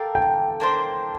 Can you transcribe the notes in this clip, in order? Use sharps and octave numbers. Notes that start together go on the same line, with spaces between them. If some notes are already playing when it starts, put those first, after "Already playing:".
Already playing: G4 A4 A#4 D5 F5
G5
A#3 D4 A4 C5